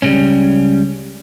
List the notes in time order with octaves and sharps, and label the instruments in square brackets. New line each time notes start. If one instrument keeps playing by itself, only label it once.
[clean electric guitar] C#2 C#3 G3 C#4